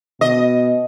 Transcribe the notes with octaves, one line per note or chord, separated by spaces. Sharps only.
B2 D#5